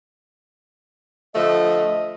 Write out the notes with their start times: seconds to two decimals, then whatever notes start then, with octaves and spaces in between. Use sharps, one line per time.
1.35 D3 F3 A3 D#5